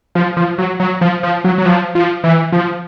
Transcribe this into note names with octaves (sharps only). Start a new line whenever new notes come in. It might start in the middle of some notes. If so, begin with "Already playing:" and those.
F3
F3
F#3
F#3
F3
F3
F#3
F#3
F3
F3
E3
F3